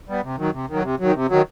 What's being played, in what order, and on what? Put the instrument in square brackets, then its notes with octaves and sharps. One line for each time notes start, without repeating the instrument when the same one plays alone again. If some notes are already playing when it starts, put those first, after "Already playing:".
[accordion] G3 B3
C3
D#3 F#3
C3
D#3 F#3
C3
D#3 F#3
C3
D#3 F#3